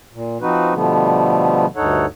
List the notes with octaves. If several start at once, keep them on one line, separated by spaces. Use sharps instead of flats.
A#2
F3 C4 D#4 F#4 B4
B2 D3 F3 G3 A3 B3
D2 G2 D#4 A4 C#5 F#5